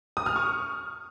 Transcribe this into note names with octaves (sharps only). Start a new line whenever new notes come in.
D#6
F6
C#6